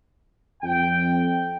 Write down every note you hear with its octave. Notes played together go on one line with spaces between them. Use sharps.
F2 G5